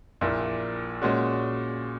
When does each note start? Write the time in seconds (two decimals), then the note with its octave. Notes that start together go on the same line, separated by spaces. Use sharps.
0.21 A#1 A#2 A#3 E4
1.02 A#2 G#3 C#4 F#4